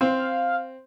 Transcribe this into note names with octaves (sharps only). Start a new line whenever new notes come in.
C4 F5